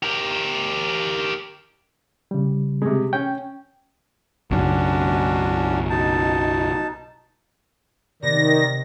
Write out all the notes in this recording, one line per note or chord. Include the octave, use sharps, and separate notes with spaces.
G4 A#4
C#3 G3
C3 G#3
C#4 G5
B1 F#2 C#3 C#4 D4 F#4
B2 D#4 A5
C3 D#3 B3 D5 A#6